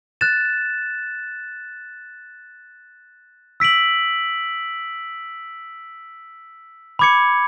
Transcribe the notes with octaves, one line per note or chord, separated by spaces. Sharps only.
F#6 A6 E7
E6 B6 D7 F#7
B5 D6 G#6 C#7